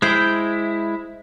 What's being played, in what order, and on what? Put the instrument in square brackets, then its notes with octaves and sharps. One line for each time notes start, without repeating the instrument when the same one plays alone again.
[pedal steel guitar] G#3 E4 [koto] C5 G5